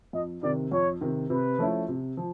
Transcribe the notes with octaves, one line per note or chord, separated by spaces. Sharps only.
F2 D#5
C3 D#3 D5
F2 C#5
C3 D#3
C3 B4
F3 A3 C#4 E4
C3
F3